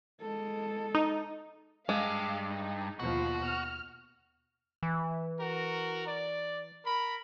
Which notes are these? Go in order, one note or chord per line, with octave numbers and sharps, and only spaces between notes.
G#3 A4
D#4
G2 G#3 F5
D#4
D#2 B2 F3 F#4
F6
E3
F#4 A#4
D5
A#4 B5